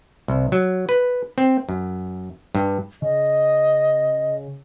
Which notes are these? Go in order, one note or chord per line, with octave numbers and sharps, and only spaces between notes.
C2
F#3
B4
C4
F#2
G2
C#3 D#5